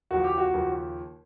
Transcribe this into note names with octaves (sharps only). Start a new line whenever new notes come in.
D#2 C#3 F3 F#4
G4
F#4
D#2 C#3 F3